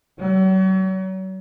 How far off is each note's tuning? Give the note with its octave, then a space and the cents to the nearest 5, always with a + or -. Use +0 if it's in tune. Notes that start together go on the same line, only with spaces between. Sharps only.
F#3 +40